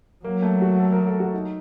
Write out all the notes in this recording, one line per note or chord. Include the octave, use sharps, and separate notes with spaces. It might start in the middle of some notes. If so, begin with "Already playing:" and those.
F#3 A#3
A3
F#4
A4
A#4
A4
F#4
D#4